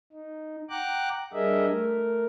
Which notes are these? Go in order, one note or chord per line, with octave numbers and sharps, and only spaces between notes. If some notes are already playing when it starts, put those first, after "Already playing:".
D#4
F#5 G5 A#5 D6 F#6
G3 D4 G#4 A#4 D#5 E5
A3 A#4